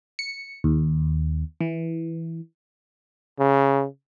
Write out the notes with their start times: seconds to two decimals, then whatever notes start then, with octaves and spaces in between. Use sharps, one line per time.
0.19 C#7
0.64 D#2
1.61 E3
3.39 C#3